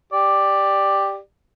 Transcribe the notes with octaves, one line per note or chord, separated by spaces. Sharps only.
G4 D5